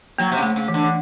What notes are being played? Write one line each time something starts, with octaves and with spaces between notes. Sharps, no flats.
F#3 A#3
C3
C#3
A3
C#3
E3
D3
E3